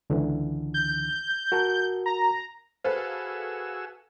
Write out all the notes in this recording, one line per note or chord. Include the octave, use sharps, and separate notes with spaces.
C#2 D3 E3
G6
F#4 A#4 A5
A#5
F#4 G#4 A4 B4 C5 F5 E6